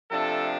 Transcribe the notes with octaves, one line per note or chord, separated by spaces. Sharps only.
C3 F3 A3 D4 A4